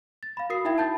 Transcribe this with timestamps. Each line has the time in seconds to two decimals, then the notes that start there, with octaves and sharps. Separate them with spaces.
0.23 A6
0.37 F5 B5
0.50 F#4 A#4 D#6 C7
0.65 D#4 E4 E5 G5 B5 G#6
0.78 A5 G6 A6